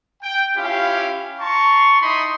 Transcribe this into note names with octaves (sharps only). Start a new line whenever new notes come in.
G5
C#4 E4 F4 G4 F5
A5 A#5 C6 C#6
D#4 E4 D#5 B5 C6 D#6